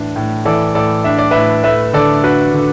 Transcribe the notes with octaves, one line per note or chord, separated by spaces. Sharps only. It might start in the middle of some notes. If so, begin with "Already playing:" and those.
Already playing: A2 E3 D4 B4
A2
E3 A4 D5
A2 A4 D5
D4 E5
D5
A2 B4 E5
A3 B4 E5
D3 A4 D5
D4 F#4 B4
D3